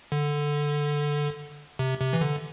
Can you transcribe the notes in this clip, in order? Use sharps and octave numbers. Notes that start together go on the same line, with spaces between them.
D3
C3
C3
E3
D3